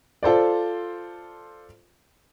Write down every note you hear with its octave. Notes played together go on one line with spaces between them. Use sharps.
F4 A4 C5 D5